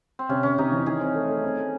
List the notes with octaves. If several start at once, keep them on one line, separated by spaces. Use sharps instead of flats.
C4
C3 C#4
C3 C#4
C3 D#4
E3
D#3 G#4
C4
A3
A3
C4
A3